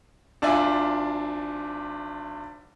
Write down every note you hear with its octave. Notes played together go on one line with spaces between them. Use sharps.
G#1 D4 F4 D5 E5 G#5